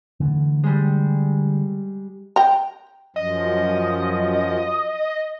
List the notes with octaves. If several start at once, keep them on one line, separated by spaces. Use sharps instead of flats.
D3 E3 A3
G3 G#3
G5 A#5
F#2 F3 D#5